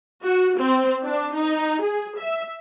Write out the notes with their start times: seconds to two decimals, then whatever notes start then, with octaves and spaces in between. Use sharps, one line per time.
0.23 F#4
0.58 C4
1.04 D4
1.35 D#4
1.82 G#4
2.19 E5